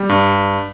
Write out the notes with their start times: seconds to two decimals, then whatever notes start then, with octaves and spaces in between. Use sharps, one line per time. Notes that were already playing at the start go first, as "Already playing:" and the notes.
Already playing: G3
0.09 G2